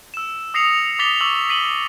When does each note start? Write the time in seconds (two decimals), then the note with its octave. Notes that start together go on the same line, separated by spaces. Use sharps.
0.14 E6 E7
0.54 D#6 A#6 C7 C#7 F7
0.99 D6 D#6 A6 B6 F7 G7
1.20 C#6 D6 E6 F#7
1.50 B6 D#7 F#7 G7